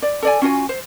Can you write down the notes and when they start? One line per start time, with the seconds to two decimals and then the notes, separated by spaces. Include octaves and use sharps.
0.02 D5
0.23 A4 D5 G#5
0.42 C#4 F4 F#4 G#5
0.69 C5